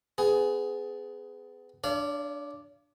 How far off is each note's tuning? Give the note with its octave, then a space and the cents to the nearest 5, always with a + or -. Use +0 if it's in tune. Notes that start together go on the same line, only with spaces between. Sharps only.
B3 +30 G#4 +10
D4 +0 C#5 +45 F5 -25